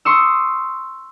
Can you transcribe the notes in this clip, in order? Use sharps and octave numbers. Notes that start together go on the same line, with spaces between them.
C6 C#6 D#6 E6